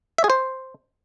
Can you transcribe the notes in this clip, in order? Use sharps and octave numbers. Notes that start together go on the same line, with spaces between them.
E5
G#4
C5